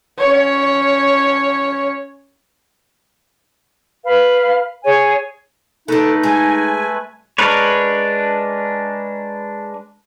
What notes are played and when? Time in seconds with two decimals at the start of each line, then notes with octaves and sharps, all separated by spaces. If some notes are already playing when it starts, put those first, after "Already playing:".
0.18 C#4 C#5
4.04 B4 F5
4.84 G#4 C#5 G#5
5.88 D3 A3 D#4 A4 B4
6.23 G#3 G#5
7.38 G#3 D4 A#4 B4 C#5